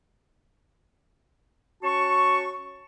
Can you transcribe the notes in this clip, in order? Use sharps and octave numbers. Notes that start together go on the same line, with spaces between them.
C#4 F#4 A5 C#6